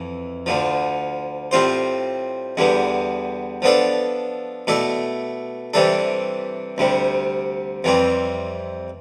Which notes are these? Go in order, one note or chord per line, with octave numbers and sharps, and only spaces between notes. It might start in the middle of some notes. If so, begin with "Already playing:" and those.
Already playing: F2 E3
D2 D3 F3
A2 G3 C4 F4 C5
E2 D3 G3 B3
F3 B3 D4 A4 D5
B2 A3 E4 A4 D5
C3 E3 G3 D4 A4
D2 C3 G3
F2 E3 G3 C4